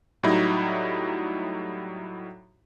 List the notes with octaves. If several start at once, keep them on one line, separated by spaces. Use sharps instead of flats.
A2 F#3 G3 D#4 E4